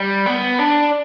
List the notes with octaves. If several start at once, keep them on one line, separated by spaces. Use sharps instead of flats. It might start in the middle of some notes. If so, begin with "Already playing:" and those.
Already playing: G3
B3
D4